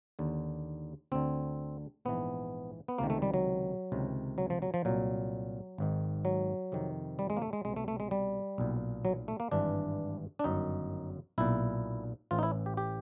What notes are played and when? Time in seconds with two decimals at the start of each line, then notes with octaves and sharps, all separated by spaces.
0.19 D#2 D3
1.12 D2 D3 C4
2.05 A#1 G#2 E3 B3
2.88 B3
2.98 C#2 C3 D#3 A#3
3.10 A3
3.22 G3
3.34 F#3
3.92 C#2 C3 D#3
4.38 F#3
4.50 F3
4.62 F#3
4.74 F3
4.85 C2 A#2 F#3
5.78 G#1 G#2 D#3
6.25 F#3
6.72 F2 C3 D#3
7.19 G3
7.30 G#3
7.37 A#3
7.42 A3
7.53 G#3
7.65 C2 B2 G#3
7.76 A3
7.88 A3
8.00 G#3
8.11 G3
8.58 B1 A#2
9.05 F#3
9.28 A3
9.40 A#3
9.52 G#1 G2 E3 D4
10.39 D4
10.44 G1 F#2 D#3 D#4
11.38 B1 A#2 E4
12.31 A1 A2 E3 F4
12.38 D#4
12.43 E4
12.66 G4
12.77 G4